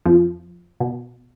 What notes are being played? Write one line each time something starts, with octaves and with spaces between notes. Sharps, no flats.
F2 F3
B2